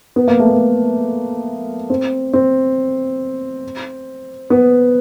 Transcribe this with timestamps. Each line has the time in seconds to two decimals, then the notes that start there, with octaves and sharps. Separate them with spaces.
0.16 B3
0.28 A#3
0.40 A3
0.51 A#3
1.90 C4
2.33 C4
4.50 B3